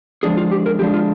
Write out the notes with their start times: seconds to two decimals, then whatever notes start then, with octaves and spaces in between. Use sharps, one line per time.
0.23 D3 F3 G#3 D4 G#4
0.37 F4
0.51 G4
0.66 A#4
0.79 D3 F3 G#3 D4 G4
0.94 F4